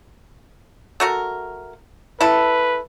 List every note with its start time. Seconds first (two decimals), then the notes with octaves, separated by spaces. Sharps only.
1.00 A3 F#4 A#4
2.21 E4 A4 B4